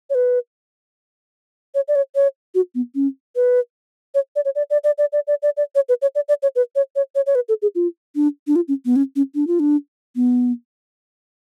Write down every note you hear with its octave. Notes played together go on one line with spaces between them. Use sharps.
C#5
B4
C#5
D5
C#5
C#5
F#4
B3
C#4
B4
C#5
D5
C#5
D5
D5
D5
D5
D5
D5
D5
D5
C#5
B4
C#5
D5
D5
C#5
B4
C#5
C#5
C#5
C#5
B4
A4
G#4
F4
D4
D4
F4
C#4
B3
C#4
C#4
D4
F4
D4
B3